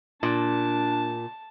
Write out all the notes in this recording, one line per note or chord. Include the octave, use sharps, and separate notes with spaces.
A#2 D4 A5